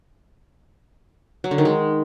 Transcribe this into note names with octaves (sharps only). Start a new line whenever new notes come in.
F#3
D3
D#3
G#3